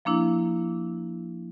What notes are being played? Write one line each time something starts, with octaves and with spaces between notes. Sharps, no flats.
F3 A#3 D4 E4